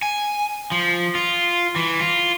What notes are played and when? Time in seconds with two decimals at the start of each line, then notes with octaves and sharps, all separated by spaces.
0.02 G#5
0.72 F3
1.15 F4
1.76 E3
2.00 F4